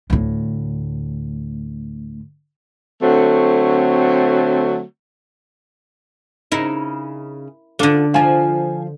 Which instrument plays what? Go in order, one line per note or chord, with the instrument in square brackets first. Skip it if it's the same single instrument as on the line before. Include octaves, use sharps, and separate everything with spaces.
[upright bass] D2 A2
[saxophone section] D3 F#3 A3 C4
[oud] C#3 D#4 [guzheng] E4 A#4
[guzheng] D3 D4 [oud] F4 A4
[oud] F3 F4 [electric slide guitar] F5 G#5